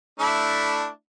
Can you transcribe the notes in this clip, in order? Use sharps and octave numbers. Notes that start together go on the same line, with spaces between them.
A3 D4 E4